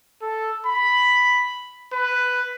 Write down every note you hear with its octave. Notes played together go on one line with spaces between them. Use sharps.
A4
B5
B4